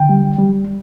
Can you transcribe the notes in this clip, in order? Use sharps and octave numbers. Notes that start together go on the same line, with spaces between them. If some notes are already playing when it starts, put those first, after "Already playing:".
Already playing: D3 G5
G3
G3